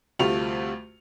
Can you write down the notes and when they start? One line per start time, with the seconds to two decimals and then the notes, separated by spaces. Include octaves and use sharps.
0.19 D2 C3 G3 A3 F4 F7